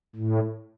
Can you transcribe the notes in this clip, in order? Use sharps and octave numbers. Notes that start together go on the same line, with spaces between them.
A2